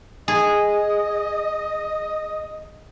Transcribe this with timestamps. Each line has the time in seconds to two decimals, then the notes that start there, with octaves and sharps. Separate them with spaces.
0.28 G#4 D#5